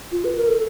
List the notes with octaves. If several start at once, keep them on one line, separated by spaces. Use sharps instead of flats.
F4
B4
A#4
A4